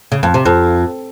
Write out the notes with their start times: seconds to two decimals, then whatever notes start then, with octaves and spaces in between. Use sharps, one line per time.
0.12 C#3
0.23 F2
0.34 C3
0.45 F2